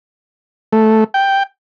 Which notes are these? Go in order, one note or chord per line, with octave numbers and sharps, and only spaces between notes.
A3
G5